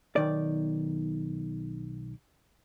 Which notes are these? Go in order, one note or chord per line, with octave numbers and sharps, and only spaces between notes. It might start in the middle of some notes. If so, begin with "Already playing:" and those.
B1 D#3 D5